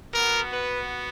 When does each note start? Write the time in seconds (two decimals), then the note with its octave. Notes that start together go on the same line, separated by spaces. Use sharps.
0.13 B3 F#4 A#4
0.51 B4